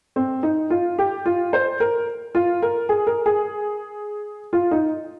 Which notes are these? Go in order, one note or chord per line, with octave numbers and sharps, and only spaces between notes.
C4
D#4
F4
G4
F4
C5
A#4
F4
A#4
G#4
A#4
G#4
F4
D#4